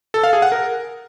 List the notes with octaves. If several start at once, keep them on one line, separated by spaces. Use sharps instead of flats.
A4
F5
G#4
F#5
A#4